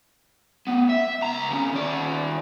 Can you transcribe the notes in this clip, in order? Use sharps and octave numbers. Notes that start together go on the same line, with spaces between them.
B3 C#4
E5
C#2 A#5
D3 C#4
D#2 D5